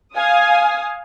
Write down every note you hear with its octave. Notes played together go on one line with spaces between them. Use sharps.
F5 G#5 D#6